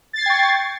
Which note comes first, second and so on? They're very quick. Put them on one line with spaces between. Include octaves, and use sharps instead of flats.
A6 C7 G#6 G5 C#6